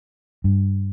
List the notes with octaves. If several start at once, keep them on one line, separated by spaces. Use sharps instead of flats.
G2